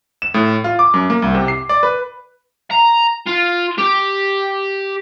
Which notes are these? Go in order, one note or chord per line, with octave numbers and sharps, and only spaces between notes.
E7
A2
F4
D6
F#2
A#3
C2
C3
C7
D5
B4
A#5
F4
G4